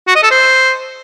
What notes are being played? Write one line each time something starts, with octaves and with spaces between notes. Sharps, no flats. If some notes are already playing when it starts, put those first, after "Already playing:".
F#4
D#5
A4
C5